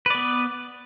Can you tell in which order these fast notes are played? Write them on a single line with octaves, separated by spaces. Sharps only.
B4 D5 B3